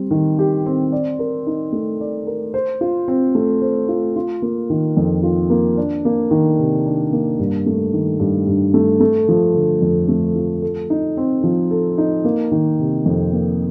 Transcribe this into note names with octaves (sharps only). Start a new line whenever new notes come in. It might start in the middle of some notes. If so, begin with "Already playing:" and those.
Already playing: G3 C4
D#3
G4
C4
D5
A#4
D#4
A3
D5
A#4
C5
F4
C4
A3
C5
F4
F4
A#3
D#3
F2
F4
A#3
D4
A#3
D#3
C3
D4
A#3
G2
A3
D#3
G2
G2
A3
A3
F3
D3
F2
A3
F3
A4
D#4
C4
F3
A4
D#4
A#3
D#3
C3
F2
A#3